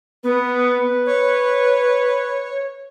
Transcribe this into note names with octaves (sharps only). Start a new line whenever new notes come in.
B3 B4
C#5